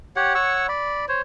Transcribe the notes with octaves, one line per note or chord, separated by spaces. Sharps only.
G4 C#5 F#5
C#5 F#5 C#6 E6
D5 B5
C5 C#5